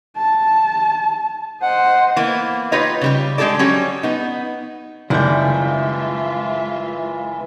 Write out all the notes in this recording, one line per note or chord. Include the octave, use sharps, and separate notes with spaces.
A5
C5 D#5 F#5
E3 A#3 B3
D#4 F4 G4 B4 C#5 D#5
C#3 G3 G4
D3 G#3 G4 A4 D5
F#3 G3 C#4
B3 D#4
F#1 D#3 E3 G3 G#3 F4 E5 G6